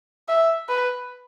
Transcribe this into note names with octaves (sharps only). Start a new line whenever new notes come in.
E5
B4